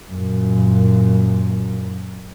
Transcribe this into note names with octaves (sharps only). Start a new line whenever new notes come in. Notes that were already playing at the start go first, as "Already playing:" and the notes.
F#2 A#2